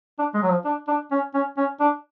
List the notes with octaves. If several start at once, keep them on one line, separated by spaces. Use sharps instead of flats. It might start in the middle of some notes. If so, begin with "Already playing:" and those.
D4
G#3
F#3
F3
D4
D4
C#4
C#4
C#4
D4